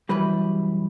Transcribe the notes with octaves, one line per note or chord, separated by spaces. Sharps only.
F#2 E3 G3 B4